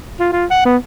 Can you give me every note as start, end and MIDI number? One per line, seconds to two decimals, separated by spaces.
0.20 0.30 65
0.32 0.45 65
0.50 0.62 78
0.65 0.77 59